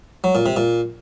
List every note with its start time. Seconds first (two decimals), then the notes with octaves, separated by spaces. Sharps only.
0.24 F#3
0.35 A#2
0.46 C3
0.57 A#2